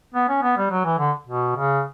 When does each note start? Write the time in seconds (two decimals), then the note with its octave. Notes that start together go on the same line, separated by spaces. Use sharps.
0.14 B3
0.28 C#4
0.42 B3
0.57 G3
0.71 F#3
0.85 E3
0.99 D3
1.27 B2
1.56 C#3